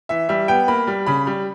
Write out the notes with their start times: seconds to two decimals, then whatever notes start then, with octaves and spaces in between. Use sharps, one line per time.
0.09 E3 E5
0.29 G3 E5
0.48 B3 G5
0.68 A#3 B5
0.87 G3
1.06 C#3 B5
1.27 G3